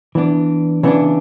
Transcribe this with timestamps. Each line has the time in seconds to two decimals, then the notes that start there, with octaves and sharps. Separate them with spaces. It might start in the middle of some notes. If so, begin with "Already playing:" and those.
0.15 E3 B3 D4
0.83 C#3 E3 B3 D4